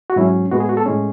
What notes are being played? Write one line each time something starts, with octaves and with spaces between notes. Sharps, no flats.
F#4
G#2 F#3 C#4 E4
A2 G#3 B3 F#4
G#4
F#4
A4
A2 G#3 C#4